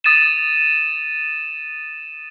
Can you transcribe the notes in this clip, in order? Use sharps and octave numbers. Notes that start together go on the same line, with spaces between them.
D#6 A6 D#7 E7